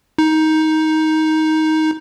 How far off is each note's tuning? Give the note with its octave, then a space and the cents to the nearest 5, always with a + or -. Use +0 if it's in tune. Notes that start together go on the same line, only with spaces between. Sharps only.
D#4 +15